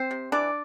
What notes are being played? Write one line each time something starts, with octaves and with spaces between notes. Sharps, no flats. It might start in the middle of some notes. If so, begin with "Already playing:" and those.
Already playing: C4 C5
C3
E3 D4 D5